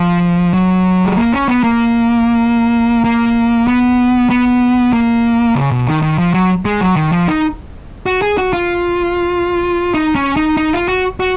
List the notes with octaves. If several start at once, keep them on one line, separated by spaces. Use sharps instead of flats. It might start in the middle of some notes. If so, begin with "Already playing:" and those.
Already playing: F3
F#3
G#3
A#3
C#4
B3
A#3
A#3
B3
B3
A#3
C#3
B2
D#3
D#3
F3
F#3
G#3
F#3
D#3
F3
D#4
F#4
G#4
F#4
F4
D#4
C#4
D#4
D#4
F4
F#4
F#4